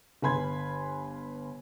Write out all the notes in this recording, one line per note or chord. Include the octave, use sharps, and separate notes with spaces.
G1 B4 G#5 B5 C6 G#6